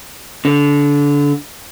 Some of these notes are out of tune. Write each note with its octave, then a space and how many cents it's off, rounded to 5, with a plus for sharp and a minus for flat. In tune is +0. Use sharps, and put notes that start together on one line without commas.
D3 -25